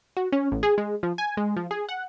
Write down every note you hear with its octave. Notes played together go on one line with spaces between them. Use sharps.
F#4
C#4
A1
G#4
G#3
F3
G#5
G#3
F3
G#4
F#5